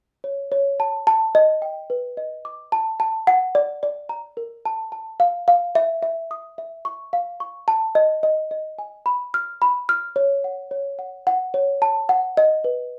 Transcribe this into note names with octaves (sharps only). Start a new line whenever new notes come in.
C#5
C#5
A5
A5
D#5
G5
B4
D#5
D6
A5
A5
F#5
D5
D5
A#5
A#4
A5
A5
F5
F5
E5
E5
D#6
E5
C#6
F5
C#6
A5
D#5
D#5
D#5
G#5
B5
F6
B5
F6
C#5
F#5
C#5
F#5
F#5
C#5
A5
F#5
D#5
B4